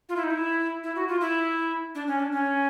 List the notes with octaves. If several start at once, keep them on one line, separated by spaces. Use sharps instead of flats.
F4
E4
D#4
E4
E4
F#4
F4
E4
D4
C#4
D4
C#4